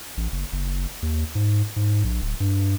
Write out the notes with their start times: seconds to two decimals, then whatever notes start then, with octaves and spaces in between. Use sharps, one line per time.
0.17 A1
0.32 F#1
0.53 F#1
1.02 D#2
1.35 G#2
1.76 G#2
2.04 A#1
2.22 D1
2.40 G2